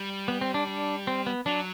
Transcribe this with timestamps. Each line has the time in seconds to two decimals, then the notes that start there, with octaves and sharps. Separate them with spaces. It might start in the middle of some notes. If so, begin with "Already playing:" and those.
Already playing: G3
0.28 B3
0.41 C4
0.54 D4
0.67 D4
1.07 C4
1.27 B3
1.46 F#3 D4